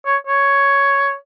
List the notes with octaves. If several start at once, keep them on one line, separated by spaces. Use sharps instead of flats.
C#5
C#5